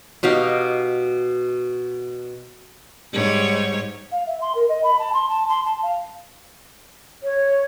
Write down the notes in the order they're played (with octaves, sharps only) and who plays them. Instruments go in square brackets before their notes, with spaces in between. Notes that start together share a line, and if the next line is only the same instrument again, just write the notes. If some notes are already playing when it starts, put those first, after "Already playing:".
[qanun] B2 D#4 G4 F5
[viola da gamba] G#2 G3 C#5
[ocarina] F5
E5
C6
A#4
D#5
B5
A5
C6
A5
C6
A5
F5
[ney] C#5